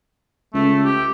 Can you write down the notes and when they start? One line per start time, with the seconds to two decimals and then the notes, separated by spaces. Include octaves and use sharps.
0.54 C#2 A3
0.85 G4